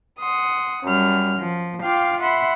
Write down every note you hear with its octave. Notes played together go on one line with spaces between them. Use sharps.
F#5 C6 D#6
F#2 G3 F6
F3
F4 F5 G5 D6 F6
E5 F#5 B5 C6